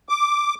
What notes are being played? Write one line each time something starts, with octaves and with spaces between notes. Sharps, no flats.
D6